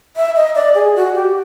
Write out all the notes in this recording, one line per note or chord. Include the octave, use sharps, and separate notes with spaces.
E5
D#5
D5
G#4
F#4
G4